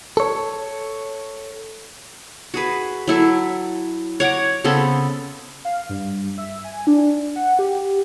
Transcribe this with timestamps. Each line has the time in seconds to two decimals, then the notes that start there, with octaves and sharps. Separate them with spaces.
0.17 A4 C#5
2.54 F#4 G#4 B4
3.08 F#3 E4 A4
4.20 C#5 F#5 A#5 D6
4.64 C#3 B3 C4 A4
5.65 F5
5.89 G2
6.38 E5
6.64 G#5
6.87 D4
7.36 F#5
7.59 G4